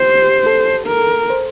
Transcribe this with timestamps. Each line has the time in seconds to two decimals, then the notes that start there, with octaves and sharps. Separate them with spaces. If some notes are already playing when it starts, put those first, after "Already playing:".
Already playing: G4 C5
0.46 A4
0.87 A#4
1.30 C5